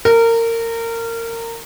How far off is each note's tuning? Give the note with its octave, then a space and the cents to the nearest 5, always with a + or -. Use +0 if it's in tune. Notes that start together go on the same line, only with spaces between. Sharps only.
A#4 -25